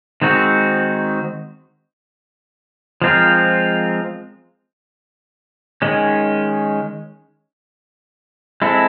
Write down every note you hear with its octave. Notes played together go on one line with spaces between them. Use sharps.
D#3 G#3 C4 D#4 F#4
F3 G#3 C4 F4 A#4
D#3 G#3 C#4
G#3 C4 E4 A4